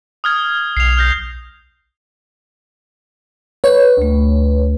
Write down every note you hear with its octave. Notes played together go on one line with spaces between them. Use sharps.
D#6 F6 G#6
B1 C7 F7
F6 G6 A#6
B4 C#5
D2 A3